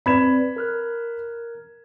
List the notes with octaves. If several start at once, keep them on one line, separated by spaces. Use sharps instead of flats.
C4 B4 D5 B5 G#6 E7
A#4 F6 F#6